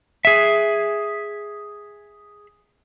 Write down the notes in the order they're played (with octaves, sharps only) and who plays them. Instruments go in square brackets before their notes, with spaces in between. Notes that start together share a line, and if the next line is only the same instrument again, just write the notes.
[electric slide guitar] G#4 E5